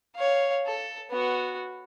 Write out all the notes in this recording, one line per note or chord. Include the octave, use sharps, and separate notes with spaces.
C#5 F5
A4
B3 F#4